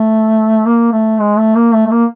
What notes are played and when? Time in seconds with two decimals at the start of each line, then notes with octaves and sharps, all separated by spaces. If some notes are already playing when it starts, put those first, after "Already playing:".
Already playing: A3
0.65 A#3
0.92 A3
1.19 G#3
1.37 A3
1.55 A#3
1.73 A3
1.87 A3
1.91 A#3